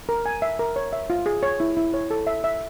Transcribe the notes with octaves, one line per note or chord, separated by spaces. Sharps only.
A#4
G#5
E5
A#4
C#5
E5
F4
G#4
C#5
E4
E4
C#5
A4
E5
E5